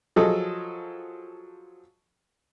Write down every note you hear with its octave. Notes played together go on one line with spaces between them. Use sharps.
F3 F#3 G#4 A4 D#5